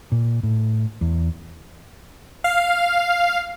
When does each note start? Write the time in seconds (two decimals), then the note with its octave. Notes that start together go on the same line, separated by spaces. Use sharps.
0.12 A#2
0.43 A2
1.01 E2
2.44 F5